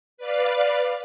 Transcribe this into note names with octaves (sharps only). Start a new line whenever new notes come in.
B4 D5 F5